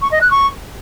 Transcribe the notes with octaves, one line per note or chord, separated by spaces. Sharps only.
C#6
D#5
F#6
C#6